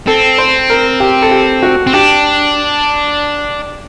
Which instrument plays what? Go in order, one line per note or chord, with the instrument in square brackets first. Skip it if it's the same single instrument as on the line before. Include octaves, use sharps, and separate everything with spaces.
[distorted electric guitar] C4 [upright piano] A4
[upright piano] C5
A#4
G4
A4
G4
F#4
[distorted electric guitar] C4
[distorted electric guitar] D4 [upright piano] G4